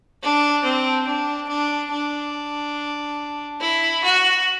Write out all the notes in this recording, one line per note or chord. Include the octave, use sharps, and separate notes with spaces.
D4
C4
D4
D4
D4
E4
F#4